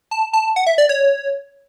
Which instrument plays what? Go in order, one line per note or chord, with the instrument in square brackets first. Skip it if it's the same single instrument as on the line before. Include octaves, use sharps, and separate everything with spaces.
[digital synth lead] A5
A5
F#5
E5
D5
C#5